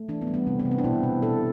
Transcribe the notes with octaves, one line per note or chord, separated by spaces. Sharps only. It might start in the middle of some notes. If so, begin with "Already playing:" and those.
Already playing: A3
E3 D4
B3
G3
B3
C3 C4
B3
C3
C4
D4
B2 E4
B2
B2 A4